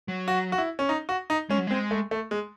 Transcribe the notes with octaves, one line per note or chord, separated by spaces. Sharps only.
F#3
F#4
F#4
E4
C#4
D#4
F#4
D#4
G#3 C#4
F#3
G#3 C4
A3
A3
G#3